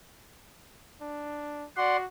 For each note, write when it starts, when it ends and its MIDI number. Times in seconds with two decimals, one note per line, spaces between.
1.01 1.66 62
1.77 2.06 66
1.77 1.97 74
1.77 1.97 78
1.77 1.97 84